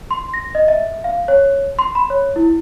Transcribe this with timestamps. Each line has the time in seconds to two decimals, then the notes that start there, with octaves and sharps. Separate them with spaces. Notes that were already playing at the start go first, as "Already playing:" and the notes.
0.11 C6
0.34 A#6
0.55 D#5
0.68 E5
1.04 F5
1.28 C#5
1.79 C6
1.95 B5
2.10 C#5
2.36 E4